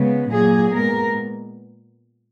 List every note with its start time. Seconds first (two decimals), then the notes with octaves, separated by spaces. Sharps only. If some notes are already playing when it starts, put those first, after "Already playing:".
Already playing: C#3 G#3 B3
0.31 A#2 F#3 A#3 G#4
0.74 A#2 G#3 B3 A#4